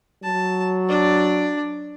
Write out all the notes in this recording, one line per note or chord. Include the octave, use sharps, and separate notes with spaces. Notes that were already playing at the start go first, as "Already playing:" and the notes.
F#3 A5
D4 D5